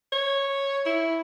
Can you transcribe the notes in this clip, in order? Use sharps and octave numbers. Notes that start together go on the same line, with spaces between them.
C#5
E4